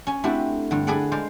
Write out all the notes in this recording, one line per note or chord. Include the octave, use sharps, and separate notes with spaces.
C#4 G#5
A3 C4 D4 E4 F#4 G4
G2 D3
D4 G#4 A4 B4 D5 F#5
G#3 C5 D5 F5